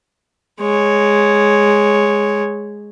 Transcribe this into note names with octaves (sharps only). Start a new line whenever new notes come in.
G#3 C#5